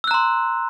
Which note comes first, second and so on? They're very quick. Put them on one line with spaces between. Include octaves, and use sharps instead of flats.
E6 F#6 A#5 C6